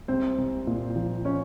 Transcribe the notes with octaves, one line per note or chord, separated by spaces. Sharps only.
C2 C4 C5
C2
A#2
F3
C#4 C#5